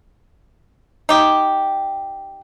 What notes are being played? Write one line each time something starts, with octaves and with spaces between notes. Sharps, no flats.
D#4 G4